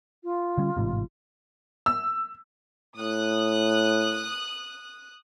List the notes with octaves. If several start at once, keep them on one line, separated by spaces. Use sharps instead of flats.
F4
D3 G3 C#4
A1 G#2 C3
E6
A2 D#6 F#6